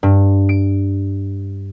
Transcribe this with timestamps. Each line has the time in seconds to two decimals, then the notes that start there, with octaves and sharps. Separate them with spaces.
0.03 G2
0.49 D7